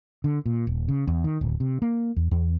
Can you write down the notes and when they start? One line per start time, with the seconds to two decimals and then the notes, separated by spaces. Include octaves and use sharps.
0.24 D3
0.46 A#2
0.67 D#1
0.88 C#3
1.07 E2
1.24 D#3
1.41 D1
1.60 C3
1.82 A#3
2.16 E2
2.31 E2